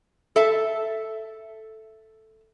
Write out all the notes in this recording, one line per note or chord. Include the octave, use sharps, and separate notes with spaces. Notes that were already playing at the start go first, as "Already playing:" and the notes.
A4 E5 A5